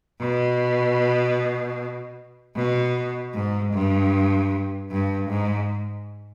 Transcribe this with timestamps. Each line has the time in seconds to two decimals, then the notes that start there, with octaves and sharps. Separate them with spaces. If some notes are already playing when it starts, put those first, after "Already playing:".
0.20 B2
2.56 B2
3.34 G#2
3.73 G2
4.91 G2
5.29 G#2